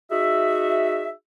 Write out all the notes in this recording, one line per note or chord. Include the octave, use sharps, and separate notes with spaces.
D#4 F#4 G#4 E5